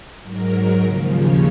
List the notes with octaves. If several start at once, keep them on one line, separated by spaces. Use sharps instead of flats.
G#2 F#3 A#4
D#2 C#3 F3
C#5